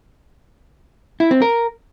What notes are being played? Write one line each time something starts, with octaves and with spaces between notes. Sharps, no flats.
E4
C4
A#4